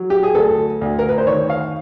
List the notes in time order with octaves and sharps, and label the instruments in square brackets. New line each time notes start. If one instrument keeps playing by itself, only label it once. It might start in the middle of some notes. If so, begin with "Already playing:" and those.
Already playing: [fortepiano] F#3
G4
G#4
D2 A4
D2
A#4
B4
C5
D#3 C#5
F5